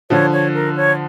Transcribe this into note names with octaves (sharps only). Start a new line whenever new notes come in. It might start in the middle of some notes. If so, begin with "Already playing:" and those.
D3 F3 C#5
C#5
A#4
C#5